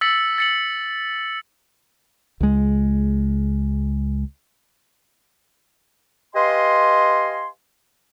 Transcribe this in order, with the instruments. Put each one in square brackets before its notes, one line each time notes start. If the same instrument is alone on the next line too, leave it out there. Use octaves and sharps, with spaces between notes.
[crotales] E6 A6 B6 C#7 F#7
A6 C#7 F#7
[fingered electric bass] C#2 G#3
[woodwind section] G4 B4 D#5 F5 G#5 C6